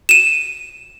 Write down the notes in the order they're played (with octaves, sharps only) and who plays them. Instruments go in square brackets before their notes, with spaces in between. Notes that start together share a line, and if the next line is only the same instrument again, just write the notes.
[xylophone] D#7 E7